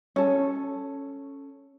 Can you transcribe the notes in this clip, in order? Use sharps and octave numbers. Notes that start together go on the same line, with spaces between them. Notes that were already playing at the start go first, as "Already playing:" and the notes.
C#4 A4